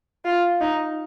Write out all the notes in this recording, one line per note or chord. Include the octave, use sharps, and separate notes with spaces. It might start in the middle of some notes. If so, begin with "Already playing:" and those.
F4
D#4